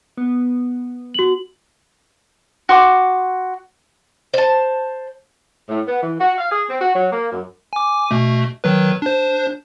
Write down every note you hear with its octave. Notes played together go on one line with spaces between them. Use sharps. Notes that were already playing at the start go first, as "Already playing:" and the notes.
B3
F#4 F#7
F#4 C6 D6
C5 A5
A2
B3
E3
F#4
F5
G#4
C4
F#4
F#3
A#3
F#2
G#5 D6
B2 A3
D#3 F#3 B4
D4 C5